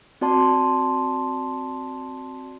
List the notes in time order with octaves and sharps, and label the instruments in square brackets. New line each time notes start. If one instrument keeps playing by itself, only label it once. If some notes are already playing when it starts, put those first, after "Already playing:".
[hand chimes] C4 F#4 D5 A5 C6